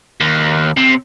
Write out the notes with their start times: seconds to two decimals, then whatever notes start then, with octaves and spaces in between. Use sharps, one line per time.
0.20 D#2
0.77 C3